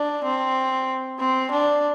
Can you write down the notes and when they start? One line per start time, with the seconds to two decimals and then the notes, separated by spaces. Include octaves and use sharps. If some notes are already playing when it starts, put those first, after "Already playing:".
Already playing: D4
0.24 C4
1.19 C4
1.51 D4